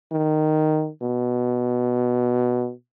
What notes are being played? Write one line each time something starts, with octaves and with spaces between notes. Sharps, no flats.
D#3
B2